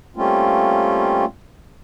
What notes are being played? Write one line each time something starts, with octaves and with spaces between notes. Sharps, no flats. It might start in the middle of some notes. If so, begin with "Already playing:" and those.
G3 A3 A#3 C4 C#4 F4